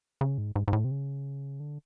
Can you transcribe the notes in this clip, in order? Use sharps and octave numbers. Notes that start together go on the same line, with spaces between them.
C#3
G#2
G#2
G#2
A2
C3
C#3
D3